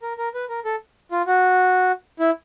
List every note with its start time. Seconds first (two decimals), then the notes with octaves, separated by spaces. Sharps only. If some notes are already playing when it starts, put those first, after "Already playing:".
0.02 A#4
0.18 A#4
0.34 B4
0.49 A#4
0.65 A4
1.12 F4
1.27 F#4
2.20 E4